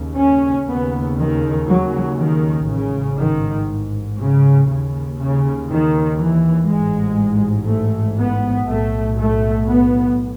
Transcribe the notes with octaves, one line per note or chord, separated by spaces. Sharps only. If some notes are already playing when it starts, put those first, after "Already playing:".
Already playing: D#2 C#3
C#4
D#2 C#3 B3
D#3
F#3
D#3
A1 G#2 C#3
D#3
C#3
D#2 C#3
C#3
D#3
E3
A1 G#2 G#3
A3
B3
B1 A2 A3
A3
B3